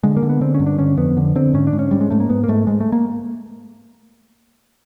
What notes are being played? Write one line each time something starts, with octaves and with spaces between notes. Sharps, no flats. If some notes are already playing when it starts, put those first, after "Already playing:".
D3 G#3
A#3
D3
B3
D3 C4
C#4
G2
D4
D3 C#4
F2 B3
D3
D3 C4
G#2 C#4
D4
G#2
C#4
G#2 G3
G#3
G#2 A3
A#3
G#2 B3
A#3
G#2 A3
G#2 G#3
A3
A#3